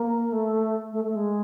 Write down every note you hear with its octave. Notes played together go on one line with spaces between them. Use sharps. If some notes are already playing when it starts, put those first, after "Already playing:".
Already playing: A#3
A3
A3
A3
G#3